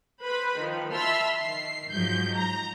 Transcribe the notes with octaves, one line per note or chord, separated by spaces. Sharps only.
B4 C5 B5
D#3 F3
E5 A5 B5 C6 E6 F6
D#3 C7
G#2 F3 F#3 G6
A#5